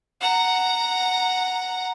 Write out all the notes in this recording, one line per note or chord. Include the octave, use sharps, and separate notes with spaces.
F#5 A#5